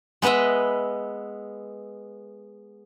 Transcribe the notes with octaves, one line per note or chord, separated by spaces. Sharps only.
G#3 B3 B4 D#5 E5